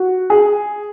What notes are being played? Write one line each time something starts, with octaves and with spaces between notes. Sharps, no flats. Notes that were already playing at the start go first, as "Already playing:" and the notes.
Already playing: F#4
G#4